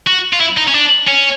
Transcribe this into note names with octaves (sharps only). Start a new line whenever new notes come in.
F#4
F4
E4
D#4
C#4
D4
C#4